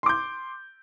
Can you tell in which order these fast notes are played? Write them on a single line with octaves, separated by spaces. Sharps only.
C6 D6 G6